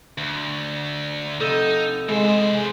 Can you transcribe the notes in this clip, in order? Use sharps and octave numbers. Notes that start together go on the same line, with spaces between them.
D2
C3 D#4 A4
E3 G#3 C5